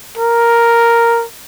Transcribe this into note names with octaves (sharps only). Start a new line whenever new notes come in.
A#4